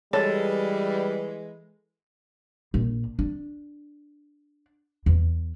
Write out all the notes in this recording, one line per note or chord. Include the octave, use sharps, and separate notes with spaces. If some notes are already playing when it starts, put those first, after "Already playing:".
E3 G3 G#3 A4 C#5
A#1
D4
E2